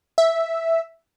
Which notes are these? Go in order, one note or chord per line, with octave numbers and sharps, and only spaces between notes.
E5